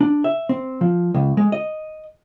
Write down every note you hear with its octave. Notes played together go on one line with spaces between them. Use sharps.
D4
E5
C4
F3
C#2
G#3
D#5